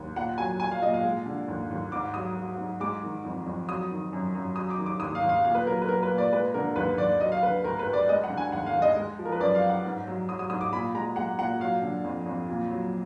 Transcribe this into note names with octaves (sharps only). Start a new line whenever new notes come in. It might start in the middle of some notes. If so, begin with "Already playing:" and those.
Already playing: D#2
A#2 F#5
F#3 G#5
F#3 G#5
F5
A#2 D#5
F5
G#3
D3
D#2
D#2
G#2 D6
F#3 D#6
F#3
G#2
G#3 D6
D#3
F2
F2
F#3 D#6
D#3
F#2
F#2
F#3 D#6
D6
D#3
D6
D#2 D#6
F5
D#2
F5
A#2 F5
B4
F#3 A#4
B4
F#3 A#4
B4
A#2
D5
G#3 B4
D3 A#4
D#2 B4
D#2 D5
F#3 D#5
F5
D3 B4
D2 A#4
B4
D2
D5
G#3 D#5
F#5
D3
G#5
D#2 F#5
F5
D#2
D#5
G#3
F3
A#4
B4
F#2 D5
F5
F#2
F#5
G#2
F#3
F#3 D#6
D#6
G#2 D#6
D6
A#2 B5
G#3 A#5
G#3 F#5
A#2 F#5
F#3 F5
D3
F2
F2
A#2
F#3